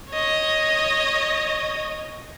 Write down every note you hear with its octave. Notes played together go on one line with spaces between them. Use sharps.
C#5 D#5